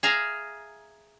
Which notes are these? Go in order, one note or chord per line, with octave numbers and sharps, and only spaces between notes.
G#4 E5 F5 A#5